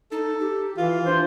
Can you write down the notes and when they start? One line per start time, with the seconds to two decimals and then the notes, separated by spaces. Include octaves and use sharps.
0.12 D#4 A4
0.40 G4
0.77 E3 F4 F5
1.06 D4 C5